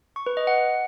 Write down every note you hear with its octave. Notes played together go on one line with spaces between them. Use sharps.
C#6
B4
D#5
F#5